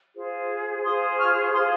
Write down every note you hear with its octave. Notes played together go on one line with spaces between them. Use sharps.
F4 G#4 C5
F4 G#4 C5 C6 D#6
C#6 F6
F4 G#4 C5 C6 D#6